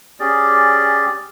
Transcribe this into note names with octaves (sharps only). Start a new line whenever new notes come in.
C#4 G4 G#4 D5